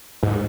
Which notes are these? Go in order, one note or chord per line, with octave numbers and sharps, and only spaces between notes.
G#2